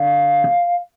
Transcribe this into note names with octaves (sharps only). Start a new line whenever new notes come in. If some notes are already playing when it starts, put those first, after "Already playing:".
Already playing: D3 F5